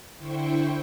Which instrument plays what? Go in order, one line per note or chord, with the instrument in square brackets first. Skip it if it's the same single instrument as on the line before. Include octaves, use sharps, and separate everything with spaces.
[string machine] D3 E4 C5 G5 C#6